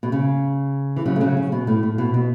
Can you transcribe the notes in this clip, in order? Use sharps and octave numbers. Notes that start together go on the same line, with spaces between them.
B2
C#3
E3
C#3 F#3
A3
C#3 F#3
C#3
B2
A2
A2
B2
B2